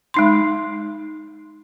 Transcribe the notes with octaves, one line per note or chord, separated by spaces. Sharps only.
G#3 D#4 C6